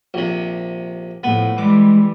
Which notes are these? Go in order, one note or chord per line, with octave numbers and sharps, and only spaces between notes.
A#1 C3
A2 F3 B3
E3 G3 G#3 D6